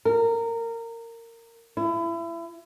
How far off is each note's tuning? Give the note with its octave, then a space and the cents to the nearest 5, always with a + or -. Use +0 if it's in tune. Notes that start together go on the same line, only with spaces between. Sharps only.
A#4 -20
E4 +30